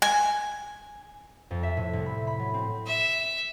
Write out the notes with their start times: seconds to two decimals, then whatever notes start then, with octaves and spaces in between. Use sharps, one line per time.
0.02 G#5
1.51 F2
1.63 E5
1.77 A2
1.93 C2
2.06 B5
2.27 B5
2.39 F#3
2.54 C4
2.86 E5